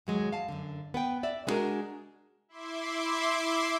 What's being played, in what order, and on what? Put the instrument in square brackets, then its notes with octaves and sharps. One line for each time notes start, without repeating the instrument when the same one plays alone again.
[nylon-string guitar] D#2 F#3 G#3
F5 A5
F#2 D3
B3 B4 G5
D5 E5
G#3 B3 D4 F#4 G#4 A#4
[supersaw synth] E4 E5 C6 D6